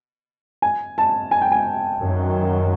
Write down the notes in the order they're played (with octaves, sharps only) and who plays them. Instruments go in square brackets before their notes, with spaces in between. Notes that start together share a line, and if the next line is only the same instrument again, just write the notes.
[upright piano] G#5
A5
G#5
G5
G#5
[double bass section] F#2 D#3 F#3